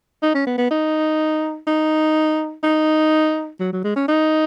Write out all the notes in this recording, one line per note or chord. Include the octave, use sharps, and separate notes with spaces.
D#4
C#4
B3
B3
D#4
D#4
D#4
F#3
F#3
G#3
C#4
D#4